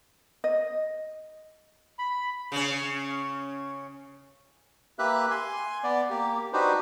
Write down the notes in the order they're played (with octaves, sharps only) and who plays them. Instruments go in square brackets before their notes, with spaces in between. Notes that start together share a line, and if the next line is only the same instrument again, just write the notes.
[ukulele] D#5
[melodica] B5
[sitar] C#3 C#4
[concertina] A#3 G4 B4 E5 F#6
G#5 C6
B3 D5
A#3 G4
D4 D#4 F#4 G4 B4 C5